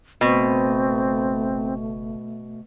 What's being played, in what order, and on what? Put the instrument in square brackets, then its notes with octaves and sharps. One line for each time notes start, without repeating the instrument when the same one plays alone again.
[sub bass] F#1 [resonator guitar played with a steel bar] B2 [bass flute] A3 [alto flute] C4